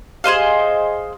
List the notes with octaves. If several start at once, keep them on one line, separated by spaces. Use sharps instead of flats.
G#4 C5 D#5 F5